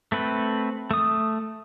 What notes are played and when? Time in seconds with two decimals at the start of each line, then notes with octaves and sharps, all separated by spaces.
0.12 A3 C4 B4
0.91 A3 D#6